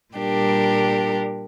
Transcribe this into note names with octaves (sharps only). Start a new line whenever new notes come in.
A#2 G3 D4 G4 A#4